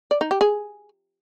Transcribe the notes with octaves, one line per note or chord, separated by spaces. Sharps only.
D5
D#4
G4
G#4